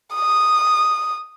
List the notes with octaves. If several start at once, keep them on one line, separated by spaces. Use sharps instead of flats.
D#6